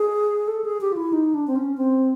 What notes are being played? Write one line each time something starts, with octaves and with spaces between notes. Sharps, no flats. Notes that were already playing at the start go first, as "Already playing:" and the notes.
Already playing: G#4
A4
G#4
G4
F4
E4
D#4
D4
C4
C#4
C4